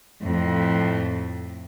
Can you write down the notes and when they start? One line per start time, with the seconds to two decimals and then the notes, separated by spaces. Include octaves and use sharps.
0.23 F2 A2